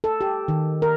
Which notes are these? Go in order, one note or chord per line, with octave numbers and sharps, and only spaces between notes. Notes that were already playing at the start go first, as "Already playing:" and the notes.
A4
G4
D#3
A#4